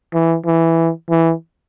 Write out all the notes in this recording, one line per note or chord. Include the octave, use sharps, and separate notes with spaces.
E3
E3
E3